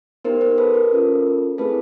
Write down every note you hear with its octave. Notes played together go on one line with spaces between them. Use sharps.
B3 D#4 G4 A#4 C5
A#4 C5
A4 B4
A#4
C#4 F4 A4
A3 C4 E4 G#4 A4 B4